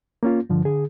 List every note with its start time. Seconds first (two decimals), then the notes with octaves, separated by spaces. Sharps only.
0.23 A#3 C#4 F4
0.50 G2 D3 F3
0.65 D3 G#4